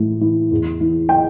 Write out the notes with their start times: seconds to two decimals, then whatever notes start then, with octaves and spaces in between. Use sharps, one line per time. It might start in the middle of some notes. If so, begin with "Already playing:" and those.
Already playing: A2 E3
0.21 E3
0.52 E2
0.81 E3
1.09 G5